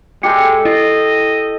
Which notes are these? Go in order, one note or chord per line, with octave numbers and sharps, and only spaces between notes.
G#3 G4 A4 G5 C#7
E4 D#5